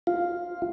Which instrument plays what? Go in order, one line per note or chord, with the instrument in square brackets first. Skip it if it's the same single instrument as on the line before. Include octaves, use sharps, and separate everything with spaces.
[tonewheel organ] F4